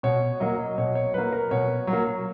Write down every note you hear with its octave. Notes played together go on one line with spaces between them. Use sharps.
B2 C#5
F#3 A#3 D#5
B2 C#5
C#5
F#3 A#3 B4
A#4
B2 C#5
F#3
A#3